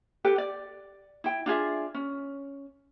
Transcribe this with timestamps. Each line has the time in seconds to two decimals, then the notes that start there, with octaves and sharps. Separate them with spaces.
0.24 G4 A4 B4 G5
0.38 D5
1.24 E4 G5
1.46 D4 F4 G#4 E5
1.94 C#4